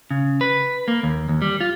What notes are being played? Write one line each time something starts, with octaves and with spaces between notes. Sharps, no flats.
C#3
B4
A#3
D#2
D#2
G3
F4